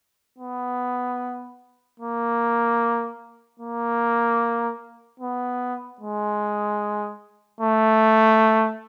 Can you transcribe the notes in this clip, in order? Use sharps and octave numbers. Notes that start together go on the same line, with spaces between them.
B3
A#3
A#3
B3
G#3
A3